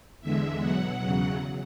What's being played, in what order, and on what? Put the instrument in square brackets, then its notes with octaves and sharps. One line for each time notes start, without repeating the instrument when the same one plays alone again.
[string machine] E2 D3 G#3 E5
B2 F#3 F#5
E2 C#3 F#3